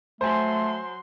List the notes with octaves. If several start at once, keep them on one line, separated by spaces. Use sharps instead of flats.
F#3 A3 C5 G#5 C6